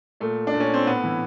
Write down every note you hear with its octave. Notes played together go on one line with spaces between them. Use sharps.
A#2 A3
D4
A#2
C#4
C4
A2 B3
E3